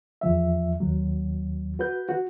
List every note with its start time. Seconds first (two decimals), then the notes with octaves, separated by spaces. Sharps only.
0.21 E2 F3 E5
0.80 D#2 F#3
1.79 F#4 B4 G6
2.09 F#4